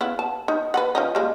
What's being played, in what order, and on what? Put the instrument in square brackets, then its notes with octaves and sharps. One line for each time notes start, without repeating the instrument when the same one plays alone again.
[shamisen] C#3 B3 E4
A5
D#4
B4 D#5 F#5
F3 C#4 D#4
G3 G#3 A#3